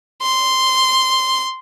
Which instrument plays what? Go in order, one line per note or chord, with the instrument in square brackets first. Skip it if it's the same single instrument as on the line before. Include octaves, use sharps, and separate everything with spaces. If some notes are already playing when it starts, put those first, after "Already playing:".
[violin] C6